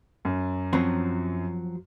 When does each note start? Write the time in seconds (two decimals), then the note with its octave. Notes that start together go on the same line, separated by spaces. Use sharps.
0.25 F#2
0.73 F3 F#3 C4